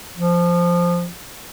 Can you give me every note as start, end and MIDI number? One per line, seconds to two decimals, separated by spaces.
0.17 1.10 53